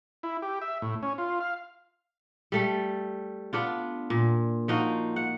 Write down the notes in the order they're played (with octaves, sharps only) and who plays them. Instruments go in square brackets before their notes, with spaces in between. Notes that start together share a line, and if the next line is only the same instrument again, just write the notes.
[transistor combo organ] E4
G4
E5
A2
C#4
F4
F5
[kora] G3 A3 A4
B3 D4 F4
A#2
F3 D#4 F#4
F#5